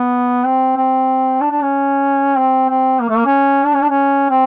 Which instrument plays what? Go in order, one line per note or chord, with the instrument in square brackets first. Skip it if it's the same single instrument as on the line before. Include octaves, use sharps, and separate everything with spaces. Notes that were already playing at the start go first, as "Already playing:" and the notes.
Already playing: [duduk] B3
C4
C4
D4
D4
C#4
C4
C4
A#3
A3
A#3
C#4
D4
C#4
D4
C#4
C4